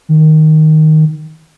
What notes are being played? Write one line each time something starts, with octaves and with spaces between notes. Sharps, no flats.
D#3